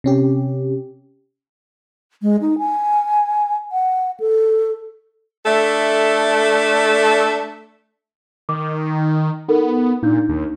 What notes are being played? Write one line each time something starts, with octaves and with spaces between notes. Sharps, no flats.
C3 C#4 G4
G#3
D#4
G#5
F#5
A4
A3 D4 A4 E5
D#3 D6
B3 D#4 A4 A#4
A#2 D4 D#4 G6
D#2